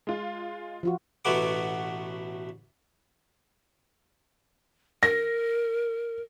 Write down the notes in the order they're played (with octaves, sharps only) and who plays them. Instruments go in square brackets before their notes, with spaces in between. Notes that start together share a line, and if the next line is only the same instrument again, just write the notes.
[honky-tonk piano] G#3 F4
[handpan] F3 F4 F#4
[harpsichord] A1 B2 F#3 A3 B3 D6
[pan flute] A#4 [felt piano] A#6